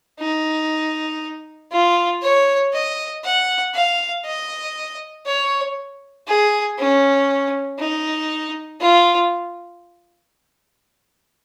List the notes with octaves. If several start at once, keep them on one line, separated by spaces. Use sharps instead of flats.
D#4
F4
C#5
D#5
F#5
F5
D#5
C#5
G#4
C#4
D#4
F4